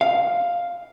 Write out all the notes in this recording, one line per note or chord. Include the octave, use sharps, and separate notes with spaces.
F5